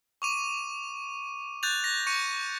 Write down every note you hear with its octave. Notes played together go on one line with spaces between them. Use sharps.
C#6 D6 D#7
F#6 G6 A6 F7
A#6
C#6 C#7 D#7